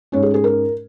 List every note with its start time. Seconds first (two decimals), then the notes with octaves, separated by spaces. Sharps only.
0.12 G#2 G#3 C#4 C#5
0.23 G#4
0.34 G#4
0.44 A#4